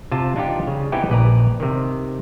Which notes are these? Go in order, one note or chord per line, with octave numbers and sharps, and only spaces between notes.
C3 F4 A5
D4 D#4 F4 G4
C#3
B3 C4 D#4 E4 G4 G#4
A#1 B4 D5 A#5
C3 D#3